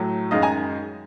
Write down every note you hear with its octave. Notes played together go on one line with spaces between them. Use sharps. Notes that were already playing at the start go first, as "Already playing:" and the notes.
Already playing: A2 F#3 A3
F#2 D#3 G#3 D#5 F5
G#5 A#5